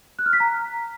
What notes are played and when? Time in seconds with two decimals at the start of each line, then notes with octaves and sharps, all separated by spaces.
0.19 F#6
0.26 F6
0.33 B6
0.40 A#5